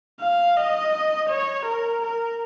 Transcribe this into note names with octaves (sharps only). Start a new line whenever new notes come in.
F5
D#5
C#5
A#4
A#4